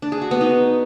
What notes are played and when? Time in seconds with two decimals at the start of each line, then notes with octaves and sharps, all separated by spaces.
0.02 D4
0.12 G#4
0.22 F#4
0.31 B3
0.41 D#4